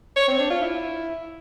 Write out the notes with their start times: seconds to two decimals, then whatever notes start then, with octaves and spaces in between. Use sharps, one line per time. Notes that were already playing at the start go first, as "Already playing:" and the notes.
0.16 C#5
0.28 C4
0.39 D4
0.50 F4
0.61 E4